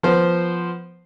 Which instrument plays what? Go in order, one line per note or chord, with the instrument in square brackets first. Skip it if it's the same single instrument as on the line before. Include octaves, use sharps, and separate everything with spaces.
[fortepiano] F3 B3 C5